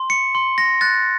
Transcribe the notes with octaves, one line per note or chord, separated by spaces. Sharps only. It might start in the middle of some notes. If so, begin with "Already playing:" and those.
Already playing: C6
C#7
C6
A#6
F#6 A6